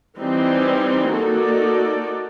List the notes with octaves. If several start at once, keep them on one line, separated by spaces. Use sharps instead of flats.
E3 G3 C4 D#4
A#3 D#4 F#4 A4 D5